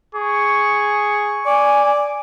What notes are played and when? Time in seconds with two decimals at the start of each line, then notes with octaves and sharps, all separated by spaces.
0.15 G#4 C#6
1.46 D5 G#5